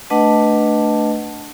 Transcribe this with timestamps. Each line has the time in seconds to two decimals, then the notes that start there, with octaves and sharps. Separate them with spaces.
0.10 A3 D4 B4 D#5 F#5 A5